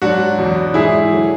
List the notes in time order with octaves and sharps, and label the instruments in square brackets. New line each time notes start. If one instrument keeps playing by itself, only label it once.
[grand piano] G#2 F#3 D4 F#4
E2 B2 F#3
G#2 E3 E4 G#4
D3 F#3